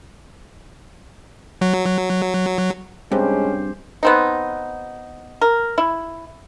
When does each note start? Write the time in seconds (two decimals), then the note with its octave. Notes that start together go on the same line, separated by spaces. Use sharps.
1.61 F#3
3.12 G2 G#3 C4 C#4 G4 C5
4.03 B3 C4 D#4
5.41 A#4
5.78 E4